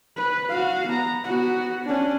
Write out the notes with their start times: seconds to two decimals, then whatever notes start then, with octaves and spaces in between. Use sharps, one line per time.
0.17 B4
0.49 F#4 F5
0.88 B3 A#5
1.24 B3 F#4
1.85 C#4 D4